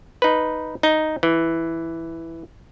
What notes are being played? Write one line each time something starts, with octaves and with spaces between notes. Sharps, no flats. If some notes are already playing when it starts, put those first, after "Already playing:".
D#4 B4
D#4
E3